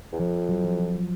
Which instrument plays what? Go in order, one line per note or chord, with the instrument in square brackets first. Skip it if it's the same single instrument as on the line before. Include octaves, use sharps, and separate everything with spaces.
[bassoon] E2
[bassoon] F2 [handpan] F3
[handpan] F#3
F3
F3
F#3